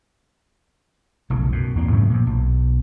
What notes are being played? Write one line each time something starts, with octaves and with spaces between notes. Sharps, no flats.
F1 B1 C#3
F#2 B2
E2 A#3 C4
G#2 C#3 F#3 A3
A#2 F3
B1